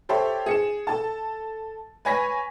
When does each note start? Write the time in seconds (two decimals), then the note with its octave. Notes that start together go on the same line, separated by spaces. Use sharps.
0.09 G4 A4 C5 C#5 E5
0.46 G#4 C#7 E7
0.87 A4 A5
2.05 B4 C#5 G#5 C#6 A#6 B6